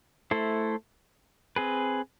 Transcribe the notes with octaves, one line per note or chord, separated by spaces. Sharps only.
A3 E4 A4 C5
C4 G#4 B4